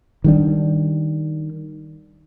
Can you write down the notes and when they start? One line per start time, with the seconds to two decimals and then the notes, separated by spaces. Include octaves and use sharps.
0.24 D#3 G3 D4